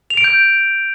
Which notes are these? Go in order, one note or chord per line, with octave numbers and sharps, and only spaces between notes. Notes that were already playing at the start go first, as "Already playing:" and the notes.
F7
D7
G6